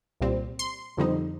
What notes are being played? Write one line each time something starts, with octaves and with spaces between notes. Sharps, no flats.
C2 A#2 G3 C4
C6
F2 D3 G3 C4 D#4